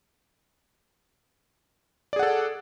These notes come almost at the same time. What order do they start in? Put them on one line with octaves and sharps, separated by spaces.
D5 G#4 F#5 A4